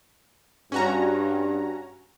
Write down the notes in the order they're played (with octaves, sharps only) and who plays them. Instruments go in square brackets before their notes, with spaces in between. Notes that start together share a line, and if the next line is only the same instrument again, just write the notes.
[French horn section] G2 [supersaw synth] C#4 F#4 A#5